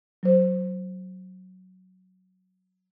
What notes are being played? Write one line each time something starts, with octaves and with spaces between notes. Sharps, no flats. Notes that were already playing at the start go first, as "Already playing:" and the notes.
F#3 C5